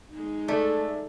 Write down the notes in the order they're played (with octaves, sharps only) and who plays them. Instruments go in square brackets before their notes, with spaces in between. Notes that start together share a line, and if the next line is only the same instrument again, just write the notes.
[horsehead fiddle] G#3 D#4
[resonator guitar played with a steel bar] A3 [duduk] A4 [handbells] D5 E5